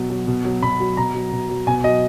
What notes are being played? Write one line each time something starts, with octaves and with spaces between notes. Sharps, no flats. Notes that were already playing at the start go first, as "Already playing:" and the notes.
Already playing: B2 F#3
F#3
B2
F#3
B2 B5
F#3
B2 A#5
F#3
B2
F#3
B2 G#5
F#3 D#5